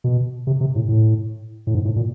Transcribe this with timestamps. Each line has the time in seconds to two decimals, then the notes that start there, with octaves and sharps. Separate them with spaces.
0.04 B2
0.47 C3
0.61 C3
0.75 A2
0.88 A2
1.67 A2
1.75 G#2
1.85 A2
1.96 A#2